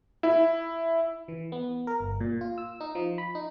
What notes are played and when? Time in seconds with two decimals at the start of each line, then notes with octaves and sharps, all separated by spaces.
0.23 E4
1.28 E3
1.52 B3
1.87 A#4
2.00 G1
2.20 A#2
2.41 F4
2.58 E6
2.80 D#4
2.95 F3
3.18 B5
3.35 D#4